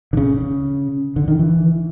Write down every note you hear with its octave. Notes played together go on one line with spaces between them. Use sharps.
D3
C#3
D3
D#3
E3